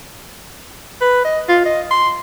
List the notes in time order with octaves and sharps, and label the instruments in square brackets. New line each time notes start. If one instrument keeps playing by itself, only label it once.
[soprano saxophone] B4
D#5
F4
D#5
C6